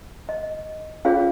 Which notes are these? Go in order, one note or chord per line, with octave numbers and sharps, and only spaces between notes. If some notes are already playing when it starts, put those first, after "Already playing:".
D#5
C#4 F4 G#4 C#5 F5